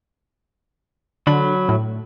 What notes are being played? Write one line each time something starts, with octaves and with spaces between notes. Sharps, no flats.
D3 F#3 B5
A2